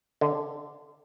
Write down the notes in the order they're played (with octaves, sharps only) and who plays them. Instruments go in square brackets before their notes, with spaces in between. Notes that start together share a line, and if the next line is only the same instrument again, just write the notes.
[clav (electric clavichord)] D3